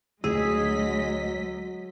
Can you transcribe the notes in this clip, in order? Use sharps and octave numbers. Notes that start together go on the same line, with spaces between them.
D2 F#3 G#3 G#4 D#5 E6 B6